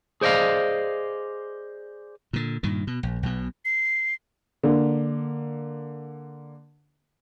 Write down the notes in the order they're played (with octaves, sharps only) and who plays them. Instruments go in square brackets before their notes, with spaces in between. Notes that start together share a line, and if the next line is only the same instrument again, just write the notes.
[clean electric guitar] G#4 C5 D5 D#5 F5
[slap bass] A#2 D3
G2 A#2 D#3
B2
A#1
B1 B2
[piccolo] C7
[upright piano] D3 A#3